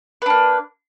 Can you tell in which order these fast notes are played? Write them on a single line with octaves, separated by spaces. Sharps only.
B4 D4 A#3